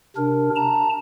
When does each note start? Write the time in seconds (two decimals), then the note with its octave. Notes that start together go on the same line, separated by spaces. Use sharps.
0.17 C3 D4 A#4
0.56 A5 A#5